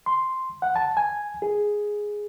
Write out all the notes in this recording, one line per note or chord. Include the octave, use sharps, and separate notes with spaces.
C6
F#5
A5
G#5
G#4